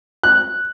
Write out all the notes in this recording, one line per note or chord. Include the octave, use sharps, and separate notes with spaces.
F#6